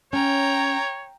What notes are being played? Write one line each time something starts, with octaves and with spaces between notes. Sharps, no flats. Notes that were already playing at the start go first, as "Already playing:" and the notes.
C#4 C#5 G5 A#5